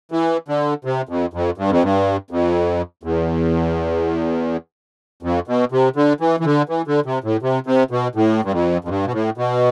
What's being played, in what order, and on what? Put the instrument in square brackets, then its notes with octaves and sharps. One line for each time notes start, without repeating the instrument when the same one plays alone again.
[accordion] E3
D3
C3
F2
F2
G2
F2
G2
F2
E2
F2
B2
C3
D3
E3
E3
D3
E3
D3
C3
A2
C3
C3
B2
A2
G2
F2
F2
G2
B2
A2
B2